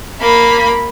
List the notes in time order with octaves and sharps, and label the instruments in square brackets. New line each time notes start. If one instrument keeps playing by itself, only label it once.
[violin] A#3 B5